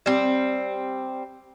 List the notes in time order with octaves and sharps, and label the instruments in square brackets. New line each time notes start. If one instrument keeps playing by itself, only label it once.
[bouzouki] G3 C4